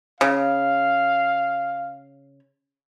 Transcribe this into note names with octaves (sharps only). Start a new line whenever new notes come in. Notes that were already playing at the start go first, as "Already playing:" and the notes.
C#3 F5